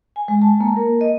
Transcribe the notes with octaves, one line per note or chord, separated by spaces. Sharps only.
G#5
G#3
A5
A#3
A#4
D#5